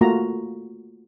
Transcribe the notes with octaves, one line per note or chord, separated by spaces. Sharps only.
A3 A#3 F4 F#4 A#5